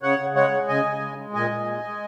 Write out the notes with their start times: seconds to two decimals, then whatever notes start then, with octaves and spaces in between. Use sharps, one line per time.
0.03 C#3 C#5 F#5
0.19 C#3
0.35 G#3 C#5 F#5
0.51 G#3
0.68 C#3 D#5 G#5
0.85 C#3
1.01 G#3
1.17 G#3
1.33 A#2 D#5 G#5
1.51 A#2
1.66 G#3
1.83 G#3